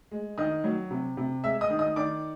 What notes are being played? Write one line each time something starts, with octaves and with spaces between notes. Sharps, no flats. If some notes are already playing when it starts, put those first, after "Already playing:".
G#3
D#3 D#5 D#6
F#3
C3
C3
G#3 E5 E6
D#5 D#6
D#3
D#5 D#6
D#3 D5 D6